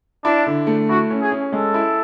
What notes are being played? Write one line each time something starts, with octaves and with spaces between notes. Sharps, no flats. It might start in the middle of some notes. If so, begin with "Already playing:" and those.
D4 E4
D3
A3
E4 F#4
C#4
G#4
C#4
G#3 A4
E4